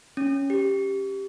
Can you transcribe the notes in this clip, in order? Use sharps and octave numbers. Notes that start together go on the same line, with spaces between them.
C#4
G4